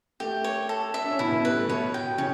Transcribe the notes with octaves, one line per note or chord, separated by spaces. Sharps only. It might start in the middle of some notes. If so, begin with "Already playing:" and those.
A3 G4
C#5
A4
E5
D4
C#4
B2 B3 E4
B2 B3
G3 B4
A3
B2 B3 C#5
G5
C#3 C#4 C#5